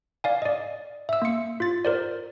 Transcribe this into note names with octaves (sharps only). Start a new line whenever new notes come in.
D5 F5 G#5
D5 D#5
E5 E6
A#3 C#7
F4 A6
A#4 C5 D5